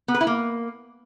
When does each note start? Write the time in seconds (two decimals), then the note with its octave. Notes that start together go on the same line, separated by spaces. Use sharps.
0.08 B3
0.14 B4
0.21 E4
0.27 A#3